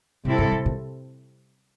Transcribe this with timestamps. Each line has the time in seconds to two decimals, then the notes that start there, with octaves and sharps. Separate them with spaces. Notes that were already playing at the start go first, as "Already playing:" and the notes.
0.25 A2 C3 G3 C4 E4 A4
0.38 G2
0.52 A2
0.66 A#2